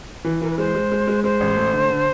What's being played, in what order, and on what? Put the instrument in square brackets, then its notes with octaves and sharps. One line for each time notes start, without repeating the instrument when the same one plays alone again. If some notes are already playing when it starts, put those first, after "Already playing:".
[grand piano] E3
[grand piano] E3 [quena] A#4
[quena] B4
[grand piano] G#3 [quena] C5
[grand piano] G#3
G#3
G#3
[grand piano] G#3 [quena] C5
[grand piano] A1
A3
D3
D3